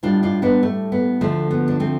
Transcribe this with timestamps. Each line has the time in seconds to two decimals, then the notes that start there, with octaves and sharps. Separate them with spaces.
0.03 A2 G3 D4 F4
0.23 D4 F4
0.42 B3 D4
0.63 A3
0.92 B3
1.21 D2 D3 F3 A3
1.51 B3
1.68 D4
1.80 A3 C4